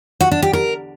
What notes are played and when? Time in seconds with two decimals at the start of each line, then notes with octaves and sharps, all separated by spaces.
0.21 F#4
0.31 D4
0.42 G4
0.53 A#4